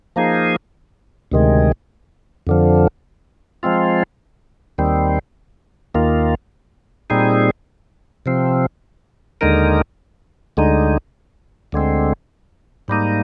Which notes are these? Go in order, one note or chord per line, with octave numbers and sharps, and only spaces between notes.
F3 A#3 D#4 G#4
D2 C3 D#3 G#3
F2 D3 F3
F3 G#3 C4 F4
D#2 D#3 G3 C4
D#2 D#3 A#3 F4
A#2 G3 C4 D#4 G#4
C3 F3 C4
D#2 D3 G#3 D#4 A#4
D2 D3 G#3 D#4
D2 D3 G#3 C4
G#2 G3 A#3 D#4